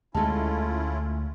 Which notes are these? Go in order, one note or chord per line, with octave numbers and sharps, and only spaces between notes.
D2 G#3 A3 C#4 E4 F4 A4 A5